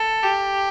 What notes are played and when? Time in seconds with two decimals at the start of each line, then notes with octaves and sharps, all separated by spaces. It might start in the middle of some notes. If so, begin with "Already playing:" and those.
Already playing: A4
0.23 G4